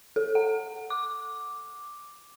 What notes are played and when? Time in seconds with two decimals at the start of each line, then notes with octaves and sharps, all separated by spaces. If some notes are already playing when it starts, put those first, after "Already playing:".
0.16 A4
0.35 F#5
0.90 D6